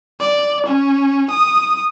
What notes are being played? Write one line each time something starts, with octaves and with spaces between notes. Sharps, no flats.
D5
C#4
D#6